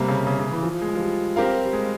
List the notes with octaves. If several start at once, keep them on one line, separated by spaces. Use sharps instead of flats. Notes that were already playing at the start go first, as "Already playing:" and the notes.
Already playing: C3 G3 A#3
C#3
C#3
C#3
E3
F3
G#3
F3
G3
C4 G4 A#4 F5
G3
G#3